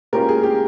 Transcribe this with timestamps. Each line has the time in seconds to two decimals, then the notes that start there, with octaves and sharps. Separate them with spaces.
0.13 A#2 G#3 C#4 F4 G4 A#4
0.29 G#4
0.43 G4